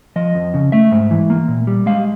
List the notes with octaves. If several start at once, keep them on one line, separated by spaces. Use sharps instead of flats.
F3 D#5
F2
C#3
A3 E5
G#2
E3
A#3
A#2
G3
G#3 F5